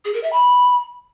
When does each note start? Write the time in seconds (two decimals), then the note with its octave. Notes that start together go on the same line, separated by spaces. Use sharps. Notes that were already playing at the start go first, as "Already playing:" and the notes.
0.05 G#4
0.14 A#4
0.23 E5
0.32 B5